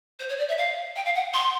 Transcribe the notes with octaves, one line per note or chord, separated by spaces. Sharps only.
C5
C#5
D5
E5
F5
G5
F5
F#5
C6